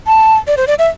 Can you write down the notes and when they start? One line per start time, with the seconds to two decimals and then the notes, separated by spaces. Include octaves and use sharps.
0.07 A5
0.47 D5
0.57 C5
0.67 D5
0.79 E5